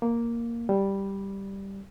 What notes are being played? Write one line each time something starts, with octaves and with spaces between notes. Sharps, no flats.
A#3
G3